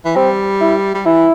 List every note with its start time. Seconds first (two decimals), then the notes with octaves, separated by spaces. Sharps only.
0.05 E3
0.16 G3 C4
0.61 E4
0.95 G3
1.06 E3 E4